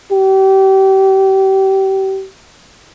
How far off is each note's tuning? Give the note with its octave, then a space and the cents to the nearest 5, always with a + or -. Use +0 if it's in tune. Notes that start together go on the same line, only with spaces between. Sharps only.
G4 -30